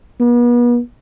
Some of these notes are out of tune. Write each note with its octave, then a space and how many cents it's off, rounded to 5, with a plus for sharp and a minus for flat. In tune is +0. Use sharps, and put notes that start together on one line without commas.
B3 -40